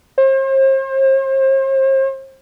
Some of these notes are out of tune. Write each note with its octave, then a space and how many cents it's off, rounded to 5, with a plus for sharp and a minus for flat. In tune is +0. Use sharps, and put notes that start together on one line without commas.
C5 +40